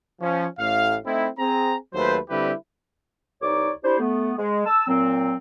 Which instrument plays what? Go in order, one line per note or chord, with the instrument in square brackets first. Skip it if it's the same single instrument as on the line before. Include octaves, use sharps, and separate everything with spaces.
[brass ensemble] F3 C#4
A1 A2 F5
A3 C4 D#4 E4
C4 G#4 A#5
D#2 F#3 A3 B4 C5
D3 G3 C4 E4 G4 B4
[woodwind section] C2 D#4 C#5 D5 D6
D4 E4 G4 C5
A3 B3
G#3
A5 E6
A#2 F#3 C4